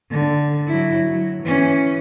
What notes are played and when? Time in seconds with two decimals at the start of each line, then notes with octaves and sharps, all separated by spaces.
0.11 D3
0.67 F#3 E4
1.12 F#3
1.42 E3 C#4